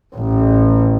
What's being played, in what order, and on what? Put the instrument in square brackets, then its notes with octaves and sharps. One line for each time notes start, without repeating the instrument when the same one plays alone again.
[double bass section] A1